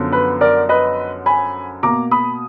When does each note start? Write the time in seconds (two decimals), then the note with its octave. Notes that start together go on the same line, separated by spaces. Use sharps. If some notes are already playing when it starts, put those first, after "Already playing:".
Already playing: F#2 D3 F3 B3
0.12 B4
0.41 A#4 D5
0.69 B4 D#5
1.26 G#5 B5
1.83 B2 A#3 A#5 D6
2.11 B5 D#6